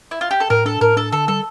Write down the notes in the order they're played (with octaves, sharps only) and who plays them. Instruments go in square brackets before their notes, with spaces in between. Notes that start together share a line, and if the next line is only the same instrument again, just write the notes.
[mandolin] E4
F4
G4
A4
[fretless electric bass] A2 [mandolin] A#4
[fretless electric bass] D4 [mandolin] A4
[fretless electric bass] A2 [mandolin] A#4
[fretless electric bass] D4 [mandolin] A4
[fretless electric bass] D3 [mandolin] A4
[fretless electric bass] G3 [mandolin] A4